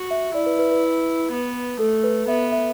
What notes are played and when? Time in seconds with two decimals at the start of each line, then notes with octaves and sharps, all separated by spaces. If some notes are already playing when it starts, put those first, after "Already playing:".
Already playing: F#4
0.11 E5
0.34 E4 D5
0.46 B4
0.59 B4
0.71 B4
1.32 B3
1.79 A3 A4
2.04 B4
2.28 B3 E5
2.52 E5